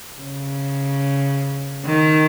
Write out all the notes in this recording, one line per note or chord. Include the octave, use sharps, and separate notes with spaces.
C#3
D#3